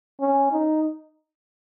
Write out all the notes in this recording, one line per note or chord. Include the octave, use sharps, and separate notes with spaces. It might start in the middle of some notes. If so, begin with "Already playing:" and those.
C#4
D#4